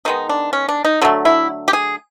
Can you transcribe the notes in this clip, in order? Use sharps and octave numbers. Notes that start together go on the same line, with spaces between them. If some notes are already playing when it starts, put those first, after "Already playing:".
D#3 G#3 B3 D#4
D4
C#4
D4
D#4
D3 F#3 A3
E4
G4
G#4